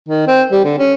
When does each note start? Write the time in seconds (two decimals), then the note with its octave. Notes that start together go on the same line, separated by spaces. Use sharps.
0.09 D#3
0.27 C4
0.52 G3
0.64 D3
0.78 C#4